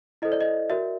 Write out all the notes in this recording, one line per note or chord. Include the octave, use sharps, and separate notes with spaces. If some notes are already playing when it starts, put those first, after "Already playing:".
E4 A4 C5 D#5
D5
D#5
F#4 A#4 D5 E5